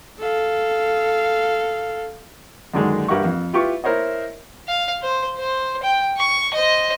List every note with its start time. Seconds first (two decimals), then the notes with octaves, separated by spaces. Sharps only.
0.20 A4 F5
2.74 F#2 D3 D#3 G#3 A#3 D4
3.08 G2 G4 A#4 E5 F#5 C#6
3.25 F2
3.53 E4 F4 G4 B4 C#6
3.84 E4 A#4 C5 C#5 D#5
4.68 F5
5.02 C5
5.38 C5
5.83 G5
6.18 C#6
6.54 C5 D#5